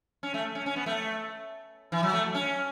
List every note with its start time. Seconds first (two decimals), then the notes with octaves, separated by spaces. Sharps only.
0.23 C#4
0.34 A3
0.55 C#4
0.66 C#4
0.76 B3
0.86 A3
1.92 E3
2.03 F#3
2.13 A3
2.35 C#4